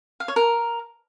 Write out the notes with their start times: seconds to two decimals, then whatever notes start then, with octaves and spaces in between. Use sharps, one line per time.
0.20 F5
0.28 C#5
0.36 A#4